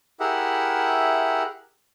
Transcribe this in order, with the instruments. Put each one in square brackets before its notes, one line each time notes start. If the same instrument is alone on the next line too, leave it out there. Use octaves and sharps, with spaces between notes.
[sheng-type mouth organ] E4 G4 G#4 A#4 E5 F#5